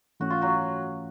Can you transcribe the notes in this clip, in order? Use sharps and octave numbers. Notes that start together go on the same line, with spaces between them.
G#2 E3 A3 C#4 F#4
F4
F#3 F#4